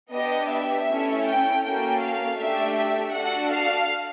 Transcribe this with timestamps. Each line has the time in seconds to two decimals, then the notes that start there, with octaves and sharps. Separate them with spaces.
0.12 B3 D4 G4 D#5
0.50 E5
0.88 A3 C#4 E4 A4
1.26 G5
1.63 A#3 C#4 F#4 A4 G5
2.02 F5
2.39 A3 D4 G4 E5
2.77 E5
3.14 D4 F#4 A4 F#5
3.52 F5